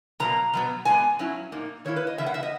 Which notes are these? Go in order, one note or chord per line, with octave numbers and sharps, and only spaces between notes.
B2 F#3 A#3 A#5
B2 F#3 B3
A#2 G#3 B3 G#5
F#3 C#4 E4
A#2 A#3 D#4
D#3 A#3 E4 C#5
B4
D#5
C#3 E3 A#3 E5
F#5
E5
D#5